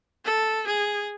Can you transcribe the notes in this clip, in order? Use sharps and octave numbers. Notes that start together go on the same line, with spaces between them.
A4
G#4